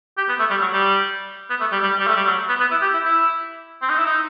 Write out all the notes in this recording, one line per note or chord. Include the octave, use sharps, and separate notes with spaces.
G4
B3
A3
G3
F#3
G3
B3
A3
G3
G3
G3
A3
G3
F#3
B3
B3
E4
G4
E4
E4
C4
D#4
E4
D#4